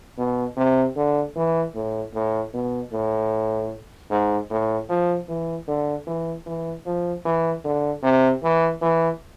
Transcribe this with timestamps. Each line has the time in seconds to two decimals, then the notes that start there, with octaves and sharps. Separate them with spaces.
0.18 B2
0.57 C3
0.96 D3
1.36 E3
1.74 A2
2.14 A2
2.53 B2
2.92 A2
4.10 G#2
4.51 A2
4.89 F3
5.29 E3
5.68 D3
6.07 E3
6.46 E3
6.86 F3
7.25 E3
7.65 D3
8.03 C3
8.43 E3
8.82 E3